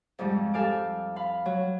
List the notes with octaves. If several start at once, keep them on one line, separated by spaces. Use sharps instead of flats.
F2 G#2 F3 G3 G#3
G4 A4 F5 G#5 D6
F5 B5
F#3